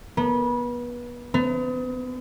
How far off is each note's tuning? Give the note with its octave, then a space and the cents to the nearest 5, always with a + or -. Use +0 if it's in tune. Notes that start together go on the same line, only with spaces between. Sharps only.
B3 -30
B3 +40